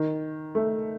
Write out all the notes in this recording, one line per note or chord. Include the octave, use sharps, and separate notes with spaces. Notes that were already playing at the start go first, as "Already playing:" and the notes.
Already playing: D#3
A3